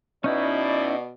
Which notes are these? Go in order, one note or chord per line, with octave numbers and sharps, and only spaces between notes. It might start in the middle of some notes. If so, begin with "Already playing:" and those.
B2 C#4 D#4 E4 D5